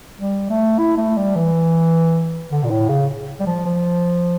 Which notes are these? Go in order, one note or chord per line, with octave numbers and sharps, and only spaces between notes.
G3
A3
E4
A3
G3
E3
D3
A#2
A2
C#3
G3
F3
F3